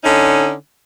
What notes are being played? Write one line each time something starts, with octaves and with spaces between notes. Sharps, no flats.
D3 C#4 D#4